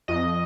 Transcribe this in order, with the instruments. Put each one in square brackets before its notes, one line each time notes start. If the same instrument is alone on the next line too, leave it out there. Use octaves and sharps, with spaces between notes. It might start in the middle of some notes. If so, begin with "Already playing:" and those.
[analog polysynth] F2 D#5